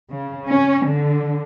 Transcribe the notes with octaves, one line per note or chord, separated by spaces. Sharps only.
C#3
C#4
D3